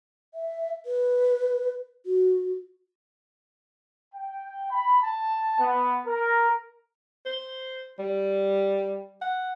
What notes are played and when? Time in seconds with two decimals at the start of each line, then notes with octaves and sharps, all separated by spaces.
0.34 E5
0.86 B4
2.06 F#4
4.14 G5
4.71 B5
5.03 A5
5.60 B3
6.06 A#4
7.26 C5
7.99 G3
9.22 F#5